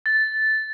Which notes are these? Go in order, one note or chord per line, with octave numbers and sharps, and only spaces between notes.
A6